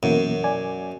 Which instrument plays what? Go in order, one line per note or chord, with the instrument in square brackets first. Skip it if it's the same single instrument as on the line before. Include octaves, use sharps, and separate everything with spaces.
[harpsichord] F#2 [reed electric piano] B2 E3 A#3
[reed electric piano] D5 G#5